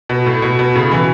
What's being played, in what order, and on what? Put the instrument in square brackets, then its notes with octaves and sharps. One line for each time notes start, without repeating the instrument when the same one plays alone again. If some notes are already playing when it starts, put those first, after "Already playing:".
[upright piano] B2
A2
B2
B2
A2 C#3
B2 E3